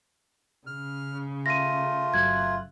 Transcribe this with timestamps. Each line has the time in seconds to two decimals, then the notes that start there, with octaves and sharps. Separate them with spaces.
0.67 C#3 F6
1.46 A3 F4 A#6 D#7
2.14 G1 F#3 F#6 G#6